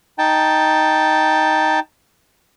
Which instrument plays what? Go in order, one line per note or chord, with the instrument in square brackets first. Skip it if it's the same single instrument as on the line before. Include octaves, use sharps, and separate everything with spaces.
[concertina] D#4 G5 A5